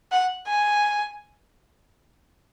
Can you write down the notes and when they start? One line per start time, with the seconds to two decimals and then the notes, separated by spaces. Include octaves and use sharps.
0.12 F#5
0.47 G#5